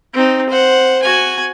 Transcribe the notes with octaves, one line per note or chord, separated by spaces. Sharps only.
C4 D#4
C5 F#5
F#4 G#5